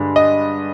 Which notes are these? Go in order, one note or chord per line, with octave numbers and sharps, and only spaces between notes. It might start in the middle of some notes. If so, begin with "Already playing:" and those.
Already playing: G2 D3 G#3 D4
D#5